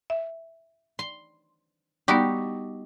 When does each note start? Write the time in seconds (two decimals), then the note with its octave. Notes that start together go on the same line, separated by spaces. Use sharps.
0.10 E5
0.99 C6
2.08 G3 B3 D#4 F#4 G4